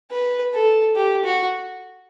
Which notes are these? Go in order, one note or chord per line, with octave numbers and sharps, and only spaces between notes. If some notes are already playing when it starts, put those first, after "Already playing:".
B4
A4
G4
F#4